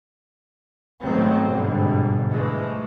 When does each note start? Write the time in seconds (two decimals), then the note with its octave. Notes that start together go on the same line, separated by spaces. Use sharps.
1.02 G#2 D#3 F#3 A3 B3 C4
1.49 G1 G#2 B2 D3 G3
2.29 E3 F3 G#3 A3